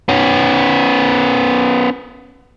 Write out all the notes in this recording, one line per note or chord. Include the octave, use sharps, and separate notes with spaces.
B3 C#4